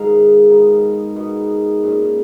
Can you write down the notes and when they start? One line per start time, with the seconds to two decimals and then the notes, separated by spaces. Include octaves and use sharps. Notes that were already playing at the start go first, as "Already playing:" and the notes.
Already playing: G#2 D#3 G#3 F5
0.49 B2 G#3 B3 D#4
1.16 B2 G#3 B3 D#4
1.83 A#2 G#3 C#4